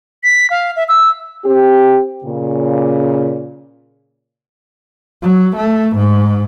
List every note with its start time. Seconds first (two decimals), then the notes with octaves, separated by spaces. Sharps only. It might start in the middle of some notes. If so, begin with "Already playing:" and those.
0.23 B6
0.50 F5
0.76 E5
0.88 E6
1.45 C4 G4
2.24 A#2 C#3
5.23 F#3
5.57 A3
5.96 G#2